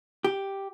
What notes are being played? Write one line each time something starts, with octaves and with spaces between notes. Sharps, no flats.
G4